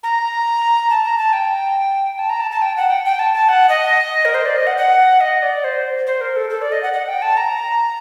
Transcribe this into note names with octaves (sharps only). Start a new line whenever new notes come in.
A#5
A5
A#5
A5
G5
A5
A#5
A5
A5
G5
F#5
G5
G5
A5
A5
F#5
D#5
A#4
C5
D5
D#5
F#5
F#5
D#5
D5
C5
C5
A#4
A4
A4
D5
D#5
F#5
F#5
G5
A5
A#5